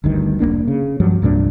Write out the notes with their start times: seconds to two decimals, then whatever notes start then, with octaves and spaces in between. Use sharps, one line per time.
0.04 G1 D2 G2 D#3
0.40 F1 F#2 A#3 D4
0.68 C#3
1.00 G2 F3 F#3
1.22 C2 G2 A#2 D4